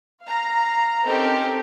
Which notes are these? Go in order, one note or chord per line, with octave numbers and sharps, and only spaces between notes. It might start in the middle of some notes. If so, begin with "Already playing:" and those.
F5 A#5
C4 C#4 D#4 G4 A4 A#4